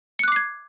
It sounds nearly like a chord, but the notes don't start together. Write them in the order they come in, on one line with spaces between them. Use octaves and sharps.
C#7 F#6 D6 C7 G#6